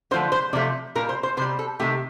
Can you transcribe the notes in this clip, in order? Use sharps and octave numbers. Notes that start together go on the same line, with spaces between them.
D3 F3 A3 C5
C5
C3 F3 A3 D5
A#2 G3 A#4
C5
C5
C3 G3 C5
A4
C3 D#3 A3 G4